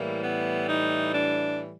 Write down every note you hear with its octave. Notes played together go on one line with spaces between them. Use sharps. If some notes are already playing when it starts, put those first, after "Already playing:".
Already playing: A2 E3 G3 A#3
B3
D#4
D4